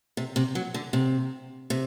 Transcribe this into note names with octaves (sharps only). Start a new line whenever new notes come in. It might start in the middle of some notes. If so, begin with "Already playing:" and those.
C3
C3
F#3
D3
C3
C3